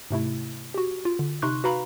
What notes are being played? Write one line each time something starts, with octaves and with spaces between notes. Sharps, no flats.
G#2 C3 A3 E4
F#4 G4
F4
D3
C3 D#4 C6 C#6 F#6
F#4 B4 F5 A#5 B5